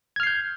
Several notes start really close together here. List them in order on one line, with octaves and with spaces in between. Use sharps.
G#6 F6 C7 G6